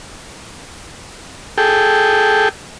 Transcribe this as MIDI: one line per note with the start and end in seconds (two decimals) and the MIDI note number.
1.58 2.49 68
1.58 2.49 69
1.58 2.49 79